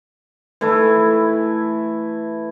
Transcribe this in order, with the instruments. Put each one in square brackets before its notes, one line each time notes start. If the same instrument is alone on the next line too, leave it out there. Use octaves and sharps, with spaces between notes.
[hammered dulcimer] E3 A3 E4